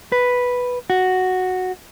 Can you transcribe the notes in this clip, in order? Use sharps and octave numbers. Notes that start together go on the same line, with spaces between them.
B4
F#4